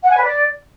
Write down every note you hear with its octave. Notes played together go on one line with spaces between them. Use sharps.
F#5
G#5
B4
D5